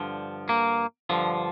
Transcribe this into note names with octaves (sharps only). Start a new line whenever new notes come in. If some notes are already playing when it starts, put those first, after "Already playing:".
Already playing: G2 D3 F3
A#3
G2 D3 F3